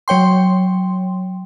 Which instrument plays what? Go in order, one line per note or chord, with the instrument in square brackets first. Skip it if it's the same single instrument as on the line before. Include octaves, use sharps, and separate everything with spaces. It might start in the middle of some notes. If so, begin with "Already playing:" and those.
[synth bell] F#3 C#5 G5 C6